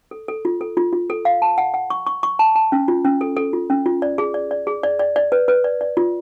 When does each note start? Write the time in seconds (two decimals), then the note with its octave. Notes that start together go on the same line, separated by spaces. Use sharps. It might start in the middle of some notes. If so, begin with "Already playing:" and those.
0.11 A4
0.28 A4
0.45 F4
0.61 A4
0.77 F4
0.93 F4
1.10 A4
1.25 F5
1.42 A5
1.58 F#5
1.74 F#5
1.90 C#6
2.07 C#6
2.23 C#6
2.39 A5
2.56 A5
2.72 C#4
2.88 F4
3.05 C#4
3.21 A4
3.37 A4
3.53 F4
3.70 C#4
3.86 F4
4.02 D5
4.18 G#4
4.34 D5
4.51 D5
4.67 G#4
4.83 D5
4.99 D5
5.16 D5
5.32 B4
5.48 B4
5.64 D5
5.81 D5
5.97 F4